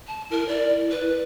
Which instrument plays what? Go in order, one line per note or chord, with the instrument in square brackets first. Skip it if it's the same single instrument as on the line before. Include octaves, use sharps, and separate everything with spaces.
[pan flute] A5
[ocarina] E4 [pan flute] A#4
[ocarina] E4 [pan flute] D5
[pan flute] B4